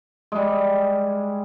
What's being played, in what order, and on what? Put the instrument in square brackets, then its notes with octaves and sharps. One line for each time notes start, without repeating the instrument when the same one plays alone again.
[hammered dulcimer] G3 G#3